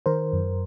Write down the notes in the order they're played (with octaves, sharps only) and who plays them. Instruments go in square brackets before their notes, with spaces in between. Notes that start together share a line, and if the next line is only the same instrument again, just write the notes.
[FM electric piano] D#3 A#4 C5
F#2